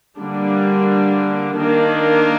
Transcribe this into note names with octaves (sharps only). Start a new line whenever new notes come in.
D3 G3 A#3 D4
D#3 A#3 D4